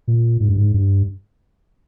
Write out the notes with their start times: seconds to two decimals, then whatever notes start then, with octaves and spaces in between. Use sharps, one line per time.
0.08 A#2
0.40 G#2
0.49 G2
0.57 G#2
0.74 G2